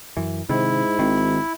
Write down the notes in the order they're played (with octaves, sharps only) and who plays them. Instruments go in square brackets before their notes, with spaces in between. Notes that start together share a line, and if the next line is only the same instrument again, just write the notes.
[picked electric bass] F#2 E3
[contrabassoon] G#2 [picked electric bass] C3 D#3 [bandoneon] E4
[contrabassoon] G#1 [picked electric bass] D#3